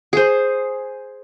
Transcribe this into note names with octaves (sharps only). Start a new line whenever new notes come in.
G#4 C5